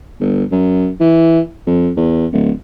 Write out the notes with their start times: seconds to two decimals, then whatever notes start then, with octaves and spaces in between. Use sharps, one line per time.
0.20 G1
0.51 F#2
1.00 E3
1.66 F2
1.96 E2
2.32 D1